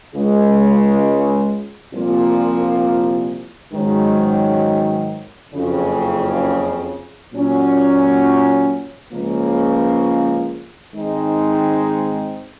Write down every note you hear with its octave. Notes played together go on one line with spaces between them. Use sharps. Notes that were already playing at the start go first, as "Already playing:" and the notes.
C#2 C#3 G#3
C2 A#2 F3 A#3
G#2 D#3 F#3 C#4
F#1 F2 C#3
A#2 F#3 C#4
C#2 C#3 F3 A#3
G#2 D#3 G#3 C4 D#4